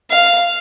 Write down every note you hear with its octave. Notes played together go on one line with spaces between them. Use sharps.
F5